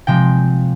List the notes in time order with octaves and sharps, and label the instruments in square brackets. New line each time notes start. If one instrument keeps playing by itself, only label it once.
[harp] C3 F3 G#3 C4 G5